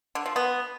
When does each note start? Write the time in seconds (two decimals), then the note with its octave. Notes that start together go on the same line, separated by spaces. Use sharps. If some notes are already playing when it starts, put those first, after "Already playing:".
0.15 D3
0.26 F3
0.36 B3